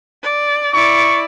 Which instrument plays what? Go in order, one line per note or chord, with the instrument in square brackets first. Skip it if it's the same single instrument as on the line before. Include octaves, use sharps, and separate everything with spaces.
[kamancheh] D5
[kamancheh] E4 D5 [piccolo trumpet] C#6